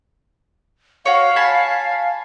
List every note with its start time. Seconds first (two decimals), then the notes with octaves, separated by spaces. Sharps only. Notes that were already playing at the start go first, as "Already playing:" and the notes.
1.06 F#4 C#5 F5
1.36 G#5 A5 B5